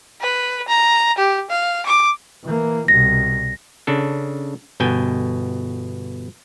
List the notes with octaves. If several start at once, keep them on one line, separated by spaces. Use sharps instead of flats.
B4
A#5
G4
F5
D6
E3 A#3
C2 B2 A#6
C#3 D4 A4
G1 B2 G5 G#5